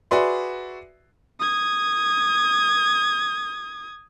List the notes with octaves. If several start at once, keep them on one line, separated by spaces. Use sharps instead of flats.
F#4 G#4 B4 D5 E5 C6
D#6 G#6